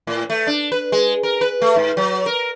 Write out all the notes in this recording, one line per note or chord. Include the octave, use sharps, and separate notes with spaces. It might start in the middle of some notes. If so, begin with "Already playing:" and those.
A2
A3
D4
B4
G#3
A#4
B4
A3
G#2
F#3
A#4